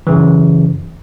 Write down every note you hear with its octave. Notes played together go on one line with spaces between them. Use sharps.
F#2 C#3 E3